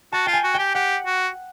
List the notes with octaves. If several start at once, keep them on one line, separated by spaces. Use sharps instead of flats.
F#4 A5
F4 G5
G#5
F#4
G4 G5
G4 F#5
F#4